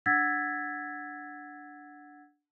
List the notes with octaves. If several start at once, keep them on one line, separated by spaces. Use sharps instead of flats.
D4 F#5 E6 G#6 A6 B6